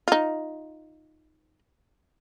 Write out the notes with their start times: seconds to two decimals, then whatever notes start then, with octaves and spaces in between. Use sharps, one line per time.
0.08 D#4 F4